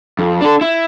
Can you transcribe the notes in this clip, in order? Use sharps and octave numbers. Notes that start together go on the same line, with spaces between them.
F2
D4 A4
E4